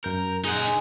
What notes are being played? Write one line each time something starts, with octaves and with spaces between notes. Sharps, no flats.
F#2 A#4 G6
G#3 D#4 F#5
C#2 G#5